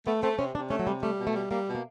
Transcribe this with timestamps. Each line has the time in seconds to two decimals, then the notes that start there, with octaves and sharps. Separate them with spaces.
0.07 A3 B3
0.22 A3 C4
0.38 C3 C#4
0.55 C3 D4
0.70 A3 C#4
0.79 F#3
0.87 C3 G3
1.03 G3 A3
1.19 B2
1.27 A3
1.34 G3
1.51 G3 A#3
1.67 B2
1.75 A#3